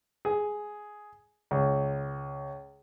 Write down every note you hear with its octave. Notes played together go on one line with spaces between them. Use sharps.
G#4
C#2